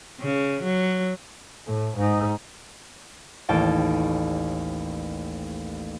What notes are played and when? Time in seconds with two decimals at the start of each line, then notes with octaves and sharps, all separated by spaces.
0.21 C#3
0.63 F#3
1.66 A2
1.96 G#2 D#4
3.49 A1 D#2 G5 A5